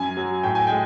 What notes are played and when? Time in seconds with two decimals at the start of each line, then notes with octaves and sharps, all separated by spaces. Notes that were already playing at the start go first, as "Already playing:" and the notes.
Already playing: F#2 G#5
0.17 F#3
0.43 A2 G5
0.55 G#5
0.67 G#3 G5